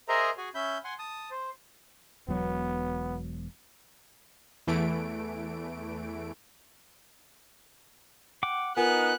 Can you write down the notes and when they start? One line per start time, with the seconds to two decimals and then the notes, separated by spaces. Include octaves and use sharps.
0.08 G#4 A#4 C5 D#5 E5 A#5
0.37 F#4 G#4 G#5
0.55 C#4 E5 B5 G6
0.84 F#5 G#5 C6
0.99 A5 D#6
1.31 C5
2.28 E1 B2 F#3 B3
4.67 E2 E3 A3 D7
8.43 F#5 G5 D6
8.77 B3 D#4 F4 A#4 G#5 F#6